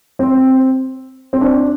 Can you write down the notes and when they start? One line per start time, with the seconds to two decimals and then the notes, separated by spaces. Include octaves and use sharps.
0.19 C4
1.33 C4
1.41 D4